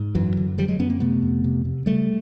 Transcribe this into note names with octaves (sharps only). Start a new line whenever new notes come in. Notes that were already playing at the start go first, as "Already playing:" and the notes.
Already playing: G#2
F#2 E3 F#3
D3
D3 F3 G3
F#3 G#3
F#2 B3 C#4
A#3 C4
C3 A3 B3
F2
C3
C3
C#3 G3 A3